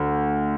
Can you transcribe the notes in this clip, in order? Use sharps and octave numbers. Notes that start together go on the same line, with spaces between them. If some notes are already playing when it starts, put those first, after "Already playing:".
Already playing: D2